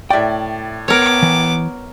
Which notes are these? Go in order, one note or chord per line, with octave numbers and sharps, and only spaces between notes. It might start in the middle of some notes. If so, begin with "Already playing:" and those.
A2 D5 E5 G5
B3 A#4 C#5 D6
E3